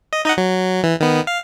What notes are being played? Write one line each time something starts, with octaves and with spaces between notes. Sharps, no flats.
D#5
D#4 D#5 F#5
F#3
E3
D#3 B3
F5